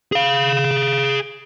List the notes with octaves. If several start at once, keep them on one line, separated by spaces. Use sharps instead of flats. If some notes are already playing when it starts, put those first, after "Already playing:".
G#4 F5